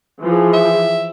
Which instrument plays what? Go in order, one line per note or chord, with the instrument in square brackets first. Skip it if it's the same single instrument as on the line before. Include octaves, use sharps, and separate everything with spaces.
[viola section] E3 F3 G#4
[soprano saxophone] E5